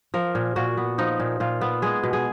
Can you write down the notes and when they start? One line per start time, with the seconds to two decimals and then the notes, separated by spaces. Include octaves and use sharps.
0.14 F3 A#4
0.35 A#2
0.56 A#2 F#4
0.77 B3
0.98 F3 D#4
1.20 A#2
1.40 A#2 F4
1.61 B3
1.82 G#3 G#4
2.04 B2
2.13 G#4